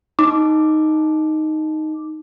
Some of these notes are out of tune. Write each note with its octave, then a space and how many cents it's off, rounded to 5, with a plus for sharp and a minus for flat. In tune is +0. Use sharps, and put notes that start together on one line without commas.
D#4 +0 D6 +0